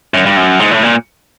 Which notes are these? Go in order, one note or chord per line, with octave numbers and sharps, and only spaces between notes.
F#2
G2
F#2
G#2
A2
A#2